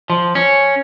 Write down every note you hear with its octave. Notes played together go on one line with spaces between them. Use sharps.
F3
C#4